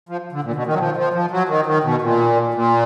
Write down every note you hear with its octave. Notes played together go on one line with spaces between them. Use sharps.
F3
D3
A#2
B2
D#3
F#3
F3
F3
F3
F#3
D#3
D#3
B2
A#2
A#2